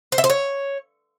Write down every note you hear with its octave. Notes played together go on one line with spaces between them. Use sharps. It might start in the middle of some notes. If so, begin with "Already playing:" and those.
C5
E5
C5
C#5